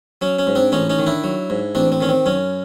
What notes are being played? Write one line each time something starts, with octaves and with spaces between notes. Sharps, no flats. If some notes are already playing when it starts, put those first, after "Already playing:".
F#3 C#4
C#4
G#2
C4 D4
A1 C#4 D#4
C#4 D#4
D#3
D4 E4
F#3
G#2
A1 C4 D4
C4
D#3 C#4
C4
F#2 C#4